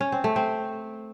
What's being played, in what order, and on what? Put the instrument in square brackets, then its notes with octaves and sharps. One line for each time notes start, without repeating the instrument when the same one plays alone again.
[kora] C#4
C4
A3
C4